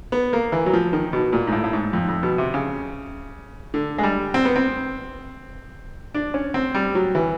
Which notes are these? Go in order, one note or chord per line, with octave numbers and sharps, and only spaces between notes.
B3
A#3
E3
F#3
F3
D#3
B2
A#2
G#2
A2
A2
G#2
F2
F2
B2
C3
C#3
D3
G#3
G3
C4
B3
C4
D4
C#4
C4
G3
F#3
E3